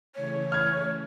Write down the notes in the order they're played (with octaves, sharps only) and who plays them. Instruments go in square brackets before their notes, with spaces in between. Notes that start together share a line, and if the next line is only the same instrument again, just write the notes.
[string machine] C#3 E3 A3 [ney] C#5
[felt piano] F6 G#6